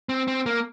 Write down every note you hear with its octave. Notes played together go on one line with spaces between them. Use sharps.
C4
C4
A#3